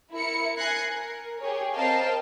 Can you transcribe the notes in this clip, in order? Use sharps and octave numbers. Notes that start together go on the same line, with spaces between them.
E4 A#4 C#7
G#5 F#6 G#6 A#6 C7 C#7
A#4
G4 G#4 C#5
C4 A#4 D#5 F5 G5 A5